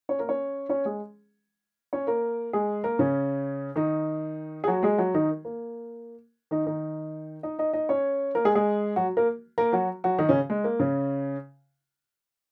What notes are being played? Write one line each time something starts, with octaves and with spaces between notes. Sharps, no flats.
C#4 C#5
A#3 A#4
C#4 C#5
C#4 C#5
G#3 G#4
C#4 C#5
A#3 A#4
G#3 G#4
A#3 A#4
C#3 C#4
D#3 D#4
G#4
F#3 F#4
G#3 G#4
F#3 F#4
D#3 D#4
A#3
D#3 D#4
D#3 D#4
D#4 D#5
D#4 D#5
D#4 D#5
C#4 C#5
A#3 A#4
G#3 G#4
G#3 G#4
F#3 F#4
A#3 A#4
A#3 A#4
F#3 F#4
F#3 F#4
D#3 D#4
C#3 C#4
G#3
A#3
C#3 C#4